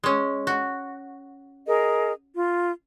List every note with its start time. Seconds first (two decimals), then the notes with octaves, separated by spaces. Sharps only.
0.04 G#3 C#4
0.47 F#4
1.67 G#4 A#4 D#5
2.34 F4